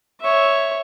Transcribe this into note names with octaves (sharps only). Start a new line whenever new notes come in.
C#5 E5